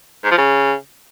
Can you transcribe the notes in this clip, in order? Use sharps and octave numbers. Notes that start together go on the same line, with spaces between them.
G#2
F3
C#3